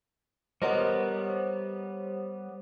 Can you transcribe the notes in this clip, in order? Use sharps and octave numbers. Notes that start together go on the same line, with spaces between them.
G3 B3 A#4 C5 C#5 D#5 F#5 A#5